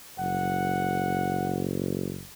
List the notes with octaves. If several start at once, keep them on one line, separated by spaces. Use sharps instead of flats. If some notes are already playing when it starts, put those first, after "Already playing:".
F#1 F#5